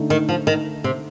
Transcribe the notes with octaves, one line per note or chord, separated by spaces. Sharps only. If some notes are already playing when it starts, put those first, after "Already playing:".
Already playing: D3 A3 D#4
D#3
F3
D#3
C3